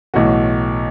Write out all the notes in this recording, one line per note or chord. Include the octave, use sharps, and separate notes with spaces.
B1 A2 E3 F#4